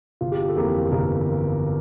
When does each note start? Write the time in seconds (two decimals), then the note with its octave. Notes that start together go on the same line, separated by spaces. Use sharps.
0.21 G1 F4
0.32 G4
0.42 F4
0.49 A4
0.56 F2 E3 A#3 G4
0.92 G1 A#4